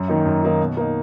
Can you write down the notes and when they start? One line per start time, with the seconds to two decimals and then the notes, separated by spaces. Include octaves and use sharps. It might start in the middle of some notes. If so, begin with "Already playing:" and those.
Already playing: F#2
0.08 D#3 A#3 D#4
0.25 F#2
0.43 D#3 A#3 D#4
0.60 B2
0.77 A#3 D#4